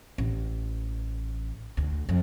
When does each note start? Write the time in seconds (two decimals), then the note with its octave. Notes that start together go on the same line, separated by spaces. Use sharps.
0.18 A1
1.77 D2
2.09 F2